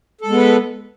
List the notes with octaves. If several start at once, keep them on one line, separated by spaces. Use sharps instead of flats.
G#3 B3 A4 B4